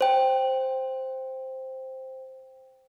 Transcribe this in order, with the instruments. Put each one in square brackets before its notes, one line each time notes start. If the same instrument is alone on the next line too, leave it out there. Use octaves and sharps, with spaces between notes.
[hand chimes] C5 G5